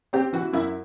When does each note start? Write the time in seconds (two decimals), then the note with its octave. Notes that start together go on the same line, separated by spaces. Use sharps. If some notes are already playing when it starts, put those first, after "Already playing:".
0.13 C4 G4
0.33 E3 F#4
0.53 F#2 E4